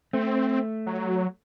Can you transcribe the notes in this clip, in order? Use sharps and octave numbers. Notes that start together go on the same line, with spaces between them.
A3 C4
F#3